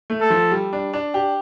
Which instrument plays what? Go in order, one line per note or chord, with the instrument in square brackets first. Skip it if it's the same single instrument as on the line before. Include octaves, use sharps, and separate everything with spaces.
[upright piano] A3
[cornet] A4
[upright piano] F3
G3
D4
D4
G4